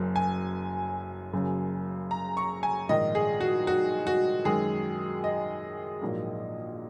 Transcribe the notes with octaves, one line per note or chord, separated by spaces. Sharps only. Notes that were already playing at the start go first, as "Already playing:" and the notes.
Already playing: F#1 F#2 F#3
G#5
F#1 F#2 C#3
A#5
C#6
G#5
A#1 G#2 D#3 D#5
G#4
F#4
F#4
F#4
F#2 D#3 G#3 G#4
D#5
A#1 G#2 F#3 A#3